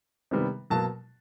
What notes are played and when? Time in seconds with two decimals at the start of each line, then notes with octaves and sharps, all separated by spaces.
0.31 C3 D#3 G3 B3
0.70 B2 F#3 A#3 A5